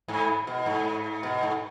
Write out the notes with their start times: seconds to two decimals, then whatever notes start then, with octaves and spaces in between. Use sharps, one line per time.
0.08 G#2
0.47 B2
0.66 G#2
1.23 B2
1.43 G#2